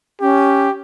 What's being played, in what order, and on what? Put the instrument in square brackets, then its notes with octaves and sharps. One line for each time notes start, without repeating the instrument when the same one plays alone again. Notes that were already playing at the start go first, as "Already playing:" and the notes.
[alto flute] C#4 [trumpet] G4